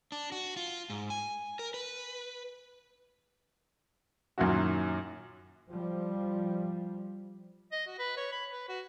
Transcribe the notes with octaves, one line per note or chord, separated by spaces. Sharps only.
D4
F#4
F4
G#2
G#5
A#4
B4
F#2 A#2 D#3 F#3 E4 F#4
F3 G3
D#5
F#4
B4
C#5
B5
B4
F#4